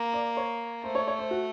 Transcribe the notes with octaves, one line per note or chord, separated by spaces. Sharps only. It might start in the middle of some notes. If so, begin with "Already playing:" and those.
Already playing: A#3
D5
C#5
A3 C5
C#5
C#5
C5
F#4